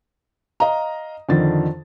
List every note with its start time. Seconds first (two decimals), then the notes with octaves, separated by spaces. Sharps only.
0.60 D#5 F5 A#5
1.29 F2 D3 D#3 A6